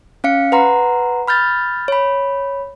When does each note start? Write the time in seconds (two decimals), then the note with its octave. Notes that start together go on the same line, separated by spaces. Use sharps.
0.24 C#4 F5 C#7
0.52 B4 F#5 A#5 C6
1.28 B5 F6 G6 A6
1.88 C#5 B5